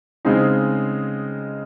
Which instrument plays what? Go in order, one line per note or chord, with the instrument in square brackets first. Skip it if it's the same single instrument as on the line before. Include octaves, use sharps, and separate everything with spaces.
[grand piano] C#3 G#3 C4 D#4